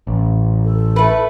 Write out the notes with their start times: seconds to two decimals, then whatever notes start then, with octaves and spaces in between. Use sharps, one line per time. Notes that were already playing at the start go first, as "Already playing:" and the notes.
0.07 A1
0.65 A4
0.96 A3 B4